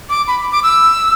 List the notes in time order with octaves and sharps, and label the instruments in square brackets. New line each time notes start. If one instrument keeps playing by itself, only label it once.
[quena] D6
B5
D6
E6